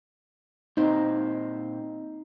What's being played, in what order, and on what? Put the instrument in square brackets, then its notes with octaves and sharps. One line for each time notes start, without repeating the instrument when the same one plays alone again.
[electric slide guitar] A#2 C4 [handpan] D#4